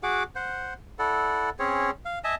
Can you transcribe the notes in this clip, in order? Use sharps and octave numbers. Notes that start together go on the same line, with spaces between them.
F#4 G#4 F#5 D6
C5 F#5
E4 A4 D5 F#5
C4 C#4 G#4 C#5
F5
D#5 E5 G#5 A5